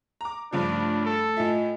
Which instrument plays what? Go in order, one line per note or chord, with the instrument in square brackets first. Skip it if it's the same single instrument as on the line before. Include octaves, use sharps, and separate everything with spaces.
[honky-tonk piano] A#5 D6
[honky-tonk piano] G2 C#3 F3 [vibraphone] A3 [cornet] D4
[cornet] A4
[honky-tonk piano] A2 E5 [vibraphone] F4 D#5 G#5